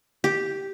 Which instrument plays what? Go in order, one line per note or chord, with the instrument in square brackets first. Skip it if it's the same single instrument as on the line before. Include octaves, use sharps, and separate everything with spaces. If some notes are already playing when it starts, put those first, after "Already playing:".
[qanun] G4